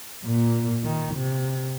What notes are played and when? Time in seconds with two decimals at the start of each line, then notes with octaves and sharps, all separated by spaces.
0.25 A#2
0.84 D#3
1.15 C3